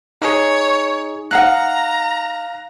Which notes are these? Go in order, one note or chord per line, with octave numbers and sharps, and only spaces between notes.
D#4 G#4 C#5
D#4 F5 F#5 A#5 F#6